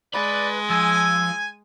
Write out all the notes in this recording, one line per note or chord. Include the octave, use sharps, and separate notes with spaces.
G#3 B4 D5 B5
F3 G#5 E6